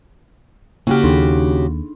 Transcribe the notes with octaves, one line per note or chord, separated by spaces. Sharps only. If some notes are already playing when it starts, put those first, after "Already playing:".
C#3 A#3 F#4 G4 F6
D#2 D4 D#4